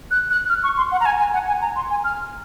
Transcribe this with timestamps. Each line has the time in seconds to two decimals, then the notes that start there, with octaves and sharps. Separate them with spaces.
0.11 F#6
0.31 F#6
0.49 F6
0.63 C#6
0.77 C6
0.92 F#5
1.00 A#5
1.06 G#5
1.19 G#5
1.33 F#5
1.47 G#5
1.62 A#5
1.76 C6
1.90 G#5
2.04 F6